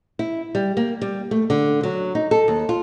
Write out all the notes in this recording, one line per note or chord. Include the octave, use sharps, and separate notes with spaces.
E4
G3
A#3
G3
A3
D3
F#3
D#4
A4
D#2
F4